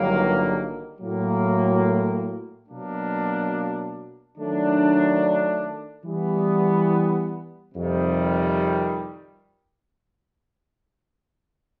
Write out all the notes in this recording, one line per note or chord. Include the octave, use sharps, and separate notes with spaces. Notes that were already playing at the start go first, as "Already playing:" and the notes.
Already playing: G1 G2 D#3 F#3 A#3
A2 F#3 A#3
B2 F#3 A#3 D4
D#3 F#3 A3 D4
E3 G3 B3
F2 C3 D#3 G3